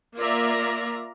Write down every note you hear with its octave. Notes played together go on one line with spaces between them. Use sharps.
A#3 F4 D5 E5 A#5